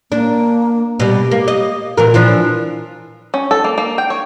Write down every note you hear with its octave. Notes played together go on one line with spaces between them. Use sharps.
A#3 D4
B2 G3 G4
A#3
D#5
A#2 E3 F4 A#4
E3 F3 D4
C#4
A4
A#3
A#3
G5
C#5